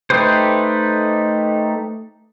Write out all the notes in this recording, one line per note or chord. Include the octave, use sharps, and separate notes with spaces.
A3 D#4 G4 B4 C5